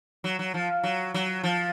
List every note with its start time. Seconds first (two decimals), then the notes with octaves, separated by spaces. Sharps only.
0.24 F#3
0.39 F#3
0.54 F3
0.83 F#3
1.14 F#3
1.43 F3